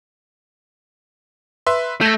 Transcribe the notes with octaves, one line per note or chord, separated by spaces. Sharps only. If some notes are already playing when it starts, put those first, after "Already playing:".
B4 E5 C6
A3 G6 G#6 A#6